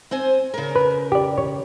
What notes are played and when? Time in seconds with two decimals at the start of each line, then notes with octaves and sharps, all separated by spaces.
0.11 C4 C5 G#5
0.54 C#3 A#4
0.76 B4
1.12 G4 D5
1.38 C#5